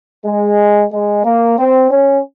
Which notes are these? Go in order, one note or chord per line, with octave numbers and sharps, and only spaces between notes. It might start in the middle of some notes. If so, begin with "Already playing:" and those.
G#3
G#3
A#3
C4
C#4